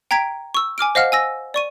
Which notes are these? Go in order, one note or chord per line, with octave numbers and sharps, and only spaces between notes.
G5 A#5 G#6 B6 D7
C#6 E6
G#5 D6 F6 D7
C5 D#5 F5 F#5 F6
G#5 E6 A#6
D5 C#6 D#7